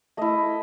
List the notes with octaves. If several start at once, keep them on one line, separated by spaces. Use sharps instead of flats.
A3 E4 D#5